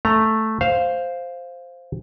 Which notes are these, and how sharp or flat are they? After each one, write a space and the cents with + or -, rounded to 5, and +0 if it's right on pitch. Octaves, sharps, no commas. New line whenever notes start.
A3 +0 A#5 +0
C5 +0 F5 +0